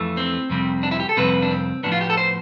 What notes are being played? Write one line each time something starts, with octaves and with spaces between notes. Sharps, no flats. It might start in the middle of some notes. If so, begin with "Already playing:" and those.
Already playing: F2 E3 A3
C4
F2 C3 G3 C4
D4
E4
G4
A4
F2 C3 G3 C4 B4
D4
C4
A2 F3 B3 D4
F4
G4
A4
C5